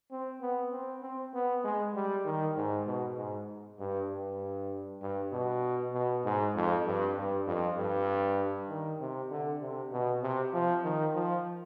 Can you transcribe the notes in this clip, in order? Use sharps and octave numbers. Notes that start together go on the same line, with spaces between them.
C4
B3
C4
C4
B3
G#3
G3
D#3
G#2
B2
G#2
G2
G2
G2
B2
B2
G#2
F2
G2
G2
F2
G2
D#3
C3
D3
C3
B2
C3
F3
D#3
F3